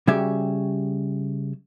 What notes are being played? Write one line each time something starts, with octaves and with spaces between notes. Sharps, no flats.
C#3 G3 F#4 G4 E5 G#5